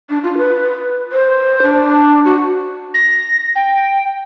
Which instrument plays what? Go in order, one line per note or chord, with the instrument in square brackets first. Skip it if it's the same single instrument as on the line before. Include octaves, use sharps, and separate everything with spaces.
[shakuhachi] D4
F4
B4
C5
D4
F#4
[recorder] A#6
G5